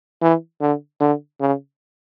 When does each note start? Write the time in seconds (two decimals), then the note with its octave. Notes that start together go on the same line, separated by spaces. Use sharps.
0.22 E3
0.61 D3
1.00 D3
1.41 C#3